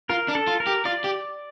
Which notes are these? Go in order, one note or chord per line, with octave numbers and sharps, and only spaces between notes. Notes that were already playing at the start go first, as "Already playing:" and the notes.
F4 A#4
D4
A4
F4
A#4
G4
F4 D5
G4